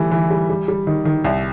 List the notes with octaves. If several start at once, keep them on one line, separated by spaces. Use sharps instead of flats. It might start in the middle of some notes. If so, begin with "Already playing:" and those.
Already playing: E3 G3 A3
E3
G3
G3
G3
D#3
D#3
C2